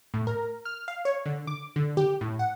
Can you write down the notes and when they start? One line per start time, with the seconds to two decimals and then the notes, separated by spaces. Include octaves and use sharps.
0.14 A2
0.27 A#4
0.65 F6
0.88 F5
1.05 C#5
1.26 D3
1.47 D6
1.76 D3
1.97 G4
2.21 A2
2.39 F#5